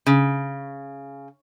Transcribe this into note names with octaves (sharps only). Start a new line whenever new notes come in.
C#3